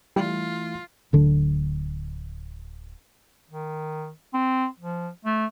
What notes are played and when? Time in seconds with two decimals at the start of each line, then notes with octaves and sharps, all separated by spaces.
0.16 E3 G3 A3 E4 F4
1.13 D1 D3 D4
3.50 D#3
4.34 C4
4.80 F3
5.25 A3